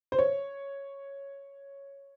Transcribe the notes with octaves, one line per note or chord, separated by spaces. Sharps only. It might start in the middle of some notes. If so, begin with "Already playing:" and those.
C5
C#5